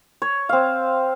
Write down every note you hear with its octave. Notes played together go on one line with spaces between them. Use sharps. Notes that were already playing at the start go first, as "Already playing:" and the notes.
C#5
C4 F5